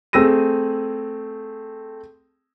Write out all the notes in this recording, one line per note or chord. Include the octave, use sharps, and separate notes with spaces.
A3 C4 G#4 E6 A#6 D#7